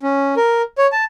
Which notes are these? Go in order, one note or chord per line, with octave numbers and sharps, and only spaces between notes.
C#4
A#4
C#5
A5